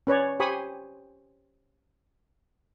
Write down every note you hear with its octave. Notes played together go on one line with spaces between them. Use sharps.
C#4 B4 C#5 D5
G4 C5 G#5 B5 C#6 D#6